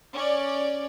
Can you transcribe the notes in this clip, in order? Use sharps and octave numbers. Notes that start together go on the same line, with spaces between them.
C#4 D5